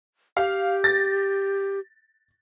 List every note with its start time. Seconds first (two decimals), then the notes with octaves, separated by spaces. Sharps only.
0.37 G4 F5
0.84 A6 A#6